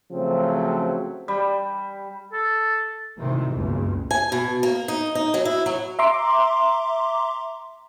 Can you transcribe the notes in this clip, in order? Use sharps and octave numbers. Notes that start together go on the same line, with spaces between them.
C#3 F3 F#3 A3 C4
G3
A4
D2 A2 C3 D#3 E3 G#3
F#1 C#2 G2 B2
G#5
B2
A#3
D#4
D#4
F#3
E4
F#3
E5 A#5 C6 D6